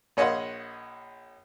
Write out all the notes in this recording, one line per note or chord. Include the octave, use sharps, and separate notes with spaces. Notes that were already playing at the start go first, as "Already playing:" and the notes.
A#1 C#5 D#5 F5 F#5 C6